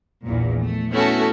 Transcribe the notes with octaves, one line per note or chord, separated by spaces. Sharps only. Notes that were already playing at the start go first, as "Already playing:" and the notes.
A#1 E2 A#2
A3
A3 B3 C#4 E4 F#4 A4